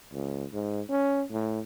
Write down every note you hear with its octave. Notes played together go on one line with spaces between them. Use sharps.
C#2
G#2
C#4
A2